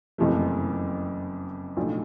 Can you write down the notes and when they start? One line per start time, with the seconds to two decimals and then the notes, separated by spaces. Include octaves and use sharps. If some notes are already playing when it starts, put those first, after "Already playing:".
0.18 F#1 F2 C3 E3 A3
1.76 B1 A2 F3 A3 D4